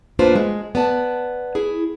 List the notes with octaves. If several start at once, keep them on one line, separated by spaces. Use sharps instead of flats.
E2 A#3 D4 F4 B4 C5
G#3
B3 D5 A5
E4 G#4